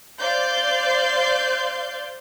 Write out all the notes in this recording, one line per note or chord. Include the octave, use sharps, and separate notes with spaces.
C5 D5 F5 C6 G6